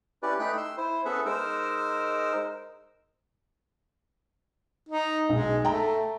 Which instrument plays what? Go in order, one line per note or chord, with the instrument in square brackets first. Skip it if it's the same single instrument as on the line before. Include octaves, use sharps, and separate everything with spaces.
[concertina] C#4 E4 G4 B4 D5
A3 D#4 G5 B5 F#6
C6 E6
E4 C5
B3 C#4 G#4 A4 B4 E5
G#3 D#4 A#4 C5 E6
[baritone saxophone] D#4
[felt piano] B1 [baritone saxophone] G#3
[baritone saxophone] A3 [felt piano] G5 A#5